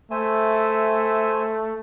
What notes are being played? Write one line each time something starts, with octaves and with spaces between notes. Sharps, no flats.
A3 C5 E5 G#5